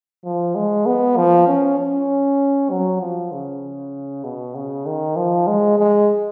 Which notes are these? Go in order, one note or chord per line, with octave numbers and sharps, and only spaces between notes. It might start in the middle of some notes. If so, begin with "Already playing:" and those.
F3
G#3
B3
F3
C#4
C#4
F#3
F3
C#3
B2
C#3
D#3
F3
G#3
G#3